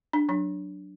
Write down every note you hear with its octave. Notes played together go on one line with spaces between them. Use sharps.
D4
F#3 D4